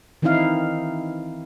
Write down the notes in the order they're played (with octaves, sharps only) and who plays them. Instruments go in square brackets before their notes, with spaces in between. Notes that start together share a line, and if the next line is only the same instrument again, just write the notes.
[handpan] D#3 E3 C4 D#4 E4 F5